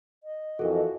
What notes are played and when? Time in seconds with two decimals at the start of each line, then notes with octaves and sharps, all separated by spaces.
0.24 D#5
0.59 F2 E3 F#4 A4 A#4